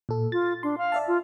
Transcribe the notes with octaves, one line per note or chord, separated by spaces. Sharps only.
A#2 A4
F4 A6
D4 C6
F5
D5 E5 A5
F4